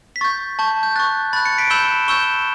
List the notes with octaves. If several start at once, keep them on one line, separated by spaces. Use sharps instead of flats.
B6
C#6 G6 A6
A5 C#6 G6
G6
C#6 F#6 A6
B5 F#6 A6
A6 C#7
B6 D7
B5 E6 G6 E7 G7
C#6 E6 G6 E7 G7